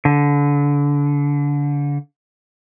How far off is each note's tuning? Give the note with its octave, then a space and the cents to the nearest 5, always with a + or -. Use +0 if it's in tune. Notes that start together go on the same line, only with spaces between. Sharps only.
D3 -30